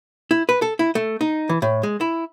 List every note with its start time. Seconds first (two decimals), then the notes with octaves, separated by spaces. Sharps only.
0.31 E4
0.49 B4
0.62 A4
0.79 E4
0.95 A3
1.21 D#4
1.49 E3
1.62 A2
1.83 G#3
2.01 E4